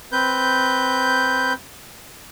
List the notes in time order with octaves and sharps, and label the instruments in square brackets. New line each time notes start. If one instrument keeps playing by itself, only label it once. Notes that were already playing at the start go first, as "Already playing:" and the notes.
[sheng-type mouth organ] C4 B4 G6